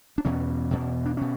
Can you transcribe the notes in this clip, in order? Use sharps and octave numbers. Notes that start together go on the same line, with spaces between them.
D4
E2 B2 C#4
E2 B2
D4
B2 C#4